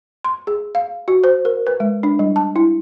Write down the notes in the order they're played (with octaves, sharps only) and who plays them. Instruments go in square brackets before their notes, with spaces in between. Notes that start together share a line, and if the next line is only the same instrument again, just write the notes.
[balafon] C6
G#4
F5
F#4
C5
A#4
B4
G#3
D4
G3
A5
E4